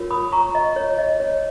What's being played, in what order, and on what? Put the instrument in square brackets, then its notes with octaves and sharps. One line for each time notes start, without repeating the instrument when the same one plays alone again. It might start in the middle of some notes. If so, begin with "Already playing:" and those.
Already playing: [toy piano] F4 A#4 C#5
B5 D#6
A#5 C#6
D#5
C#5
D#5
C#5